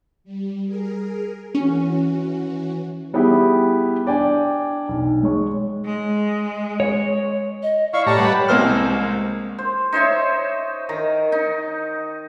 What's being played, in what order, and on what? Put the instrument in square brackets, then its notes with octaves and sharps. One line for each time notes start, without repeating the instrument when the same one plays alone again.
[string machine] G3
G#4 A#4
[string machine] E3 F#4 [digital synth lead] C#4
[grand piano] G3 B3 E4 G4 G#4
D4 D5 G5 G#5
B1
G#3 C#5 C#6
[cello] G#3
[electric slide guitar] C#5
[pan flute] D#5
[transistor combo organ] E4 [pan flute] D5 [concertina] F5 C#6
[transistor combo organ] A2 A#5 C#6 [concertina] G4 A5 [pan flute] C#5
[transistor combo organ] G3 B4 F#5
[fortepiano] C2 G#3 A#3 C5 E6 F6
[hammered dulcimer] C5
D#4 C5 C#5 E5
D#3 A#5
D#4